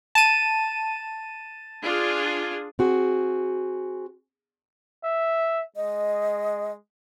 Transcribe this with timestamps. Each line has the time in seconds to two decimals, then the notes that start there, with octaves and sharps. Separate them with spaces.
0.15 A5 D#7
1.84 D4 F4 G#4
2.79 C4 F#4 G#4
5.04 E5
5.76 G#3 D#5